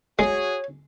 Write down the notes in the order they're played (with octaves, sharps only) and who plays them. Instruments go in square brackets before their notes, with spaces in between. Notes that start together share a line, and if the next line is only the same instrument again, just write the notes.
[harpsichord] G#3 [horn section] F#4 G#4 [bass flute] C#5